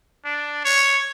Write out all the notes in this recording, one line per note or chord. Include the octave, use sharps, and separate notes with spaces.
D4
C#5